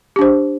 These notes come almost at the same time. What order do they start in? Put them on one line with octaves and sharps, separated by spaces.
G4 D4 C5